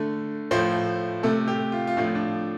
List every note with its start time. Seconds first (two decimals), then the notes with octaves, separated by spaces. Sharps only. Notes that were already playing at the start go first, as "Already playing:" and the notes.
Already playing: D3 A3
0.51 A2 F3 A3 C5
1.23 C3 A3 A4
1.48 G4
1.72 F4
1.87 F4
1.97 A2 F3 A3 D4
2.15 D4